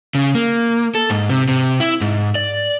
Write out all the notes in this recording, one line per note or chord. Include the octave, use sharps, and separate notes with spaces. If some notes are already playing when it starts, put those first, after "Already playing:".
C#3
A#3
A4
G#2
C3
C3
E4
G#2
D5